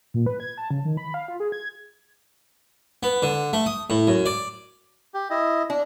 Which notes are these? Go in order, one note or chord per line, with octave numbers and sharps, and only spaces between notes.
A#2
B4
G#6
A5
C#3
D#3
B5
F5
F4
G#4
G#6
B3
D3
A3
D#6
A2
F#2
D5
G4
E4 D#5
D4